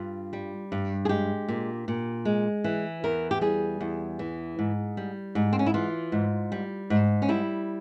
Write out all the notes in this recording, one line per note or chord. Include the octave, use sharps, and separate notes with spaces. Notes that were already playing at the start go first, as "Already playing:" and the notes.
Already playing: G2 F4
G3
G2
G#4
G#3 G4
A#2
A#2
G#3
E3
E2 A#4
G4
G3 G#4
E2
E3
G#2
G3
G#2
C4
C#4
E4
E3 F4
G#2
G3
G#2
C#4
G3 E4